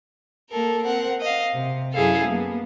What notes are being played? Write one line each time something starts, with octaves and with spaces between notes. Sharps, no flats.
A#3 A4 A#4
C4 A#4 F#5
D#5 F5
C3
F#2 F#3 E4 G#4 A4 F5
A#3 B3